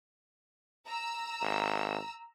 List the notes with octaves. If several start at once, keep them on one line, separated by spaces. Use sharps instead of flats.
A#5 E6
G#1